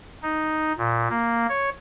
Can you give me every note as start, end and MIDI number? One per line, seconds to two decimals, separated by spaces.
0.23 0.73 63
0.78 1.08 46
1.09 1.46 58
1.49 1.70 73